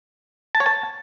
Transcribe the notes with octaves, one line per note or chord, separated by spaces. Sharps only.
A5
C#5
A5